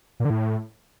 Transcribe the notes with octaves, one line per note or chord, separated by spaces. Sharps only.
A#2
D3
A2